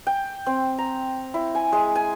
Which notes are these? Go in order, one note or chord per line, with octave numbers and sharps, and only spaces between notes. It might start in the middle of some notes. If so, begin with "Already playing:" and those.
G5
C4
A#5
E4
G#5
G#3
G#5